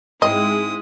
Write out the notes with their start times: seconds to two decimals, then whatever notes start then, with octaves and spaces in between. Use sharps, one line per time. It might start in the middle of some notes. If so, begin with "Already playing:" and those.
0.22 G#2 G#3 C4 E4 D#5 D#6